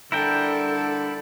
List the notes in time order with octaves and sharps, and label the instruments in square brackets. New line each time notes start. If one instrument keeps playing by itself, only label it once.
[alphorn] D3 [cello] G3 A4 [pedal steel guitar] E4 A#4 G5